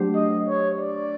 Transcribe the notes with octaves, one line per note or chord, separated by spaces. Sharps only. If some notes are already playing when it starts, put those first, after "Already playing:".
Already playing: F#3 A3 D4 G4 C5
D#5
C#5
D5